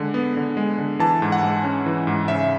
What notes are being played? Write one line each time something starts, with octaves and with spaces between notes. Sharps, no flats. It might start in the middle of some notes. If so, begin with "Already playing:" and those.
Already playing: D3 G#3
B3
D3
G#3
D3
E3 A5
G#2
F#5
G#3
C#4
E3
G#2
C#3 E5